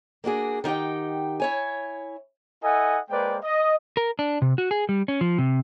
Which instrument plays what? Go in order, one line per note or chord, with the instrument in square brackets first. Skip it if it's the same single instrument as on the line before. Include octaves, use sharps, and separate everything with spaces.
[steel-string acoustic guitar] A#3 D4 F#4 G#4
D#3 D#4 G4 F#5 G5
E4 C#5 G#5
[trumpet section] E4 A4 D#5 F#5 G#5
G#3 A#3 B4 C5 D5 G5
D#5
[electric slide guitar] A#4
D4
C3
F#4
G#4
G3
C#4
F3
C3